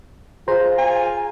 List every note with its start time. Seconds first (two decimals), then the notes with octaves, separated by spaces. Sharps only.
0.48 F4 G#4 C5 A#5
0.78 G#5